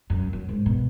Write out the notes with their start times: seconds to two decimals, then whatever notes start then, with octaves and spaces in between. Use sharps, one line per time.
0.10 F#2
0.33 F#2
0.49 G#2
0.66 B2